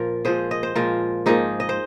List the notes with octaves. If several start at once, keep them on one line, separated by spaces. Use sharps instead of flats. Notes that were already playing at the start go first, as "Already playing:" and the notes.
Already playing: A#2 F3 F4 A#4
A#2 F3 G#3 G#4 C5
D#5
C5
A#2 F3 G#3 F4 A#4
G#2 F3 A#3 D#4 G#4
D#5
C5